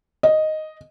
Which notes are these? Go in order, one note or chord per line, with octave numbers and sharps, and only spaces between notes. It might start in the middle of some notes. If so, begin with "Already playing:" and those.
D#5